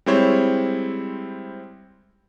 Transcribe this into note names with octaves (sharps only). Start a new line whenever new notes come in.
G3 G#3 C4 E4 C5 C#5